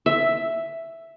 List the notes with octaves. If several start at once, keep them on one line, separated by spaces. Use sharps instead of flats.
E5